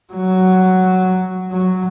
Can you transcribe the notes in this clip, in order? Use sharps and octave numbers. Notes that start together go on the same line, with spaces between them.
F#3
F#3